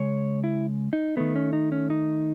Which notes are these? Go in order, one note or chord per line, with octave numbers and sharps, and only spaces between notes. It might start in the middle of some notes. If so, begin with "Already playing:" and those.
Already playing: C#3 G#3 C#5
E4
D#4
D#3 A3 B3
C#4
D#4
C#4
D#4